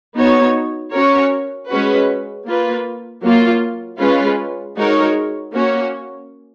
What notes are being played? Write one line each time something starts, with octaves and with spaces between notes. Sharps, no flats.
B3 D#4 F#4 C#5
C#4 F#4 A#4 C#5
G#3 C#4 F#4 B4
A#3 F4 B4
F#3 A#3 F4
G#3 C#4 F4 B4
G#3 D#4 F#4 A#4 C#5
A#3 C#4 F#4 C#5